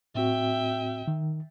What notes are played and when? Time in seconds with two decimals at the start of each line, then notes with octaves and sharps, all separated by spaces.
0.15 A2 C4 F#4 E5 G5
1.08 D#3